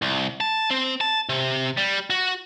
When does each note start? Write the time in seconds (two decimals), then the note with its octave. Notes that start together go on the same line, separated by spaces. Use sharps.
0.02 C2
0.41 A5
0.70 C4
1.01 A5
1.29 C3
1.77 G3
2.10 F#4